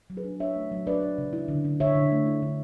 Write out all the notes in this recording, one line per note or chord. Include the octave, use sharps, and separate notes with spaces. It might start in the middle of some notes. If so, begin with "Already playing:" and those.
F#3
G#4 B4
D4
D4 C#5 E5
A3
F#3
D4 B4 D5
D4
C#3
E4
D3
D3
D3 C#5 E5
D3
A3
E4
D3